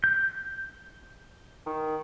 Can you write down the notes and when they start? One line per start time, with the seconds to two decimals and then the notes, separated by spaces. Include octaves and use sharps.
0.04 G6
1.66 D#3